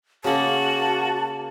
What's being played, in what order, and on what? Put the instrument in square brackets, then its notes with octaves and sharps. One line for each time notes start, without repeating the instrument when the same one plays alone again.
[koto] C#3 A#3 [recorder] F#4 [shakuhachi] A5